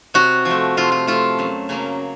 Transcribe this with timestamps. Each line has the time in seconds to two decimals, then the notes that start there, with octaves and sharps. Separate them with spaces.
0.14 C3 F#4
0.45 F3 A3
0.77 C3 F4
0.92 F4
1.07 F3 A3 F4
1.39 F#2
1.69 C#3 F#3 A#3